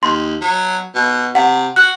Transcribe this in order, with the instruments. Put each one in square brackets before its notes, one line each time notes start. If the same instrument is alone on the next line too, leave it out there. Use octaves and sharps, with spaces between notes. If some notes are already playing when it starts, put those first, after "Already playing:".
[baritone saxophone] D#2 [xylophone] C6
[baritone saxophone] F#3
B2
[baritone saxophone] C3 [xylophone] F#5
[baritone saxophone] F#4 [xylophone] F#6